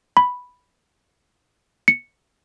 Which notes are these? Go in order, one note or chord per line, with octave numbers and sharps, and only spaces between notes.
B5
C#7